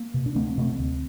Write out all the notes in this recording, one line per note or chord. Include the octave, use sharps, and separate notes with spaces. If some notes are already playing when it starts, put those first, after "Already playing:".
Already playing: A#3
C3
D4
D2 A3 C4
C3 A3 C4
D2